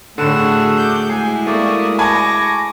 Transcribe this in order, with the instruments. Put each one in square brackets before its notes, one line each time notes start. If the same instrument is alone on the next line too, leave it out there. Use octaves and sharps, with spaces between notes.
[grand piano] A2 D3 [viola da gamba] A3 F#4 G#4 [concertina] A4 F#5 [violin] E7
[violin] D6 G6
[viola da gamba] G#3 E4 [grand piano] G#4 [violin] G#5
[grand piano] A3 A#3 [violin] F#4 E5 [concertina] D5 D#6
[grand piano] G#5 A5 B5 [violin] C#6 A#6 [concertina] D6